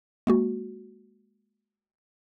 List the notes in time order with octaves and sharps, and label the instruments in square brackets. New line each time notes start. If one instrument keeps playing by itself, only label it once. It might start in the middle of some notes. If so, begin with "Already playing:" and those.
[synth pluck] G#3 A#3 F#4